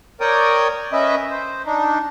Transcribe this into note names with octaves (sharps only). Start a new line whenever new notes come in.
A#4 C#5 D5 G5 D#6
C#4 B4 D#5 E5
C5
D4 D#4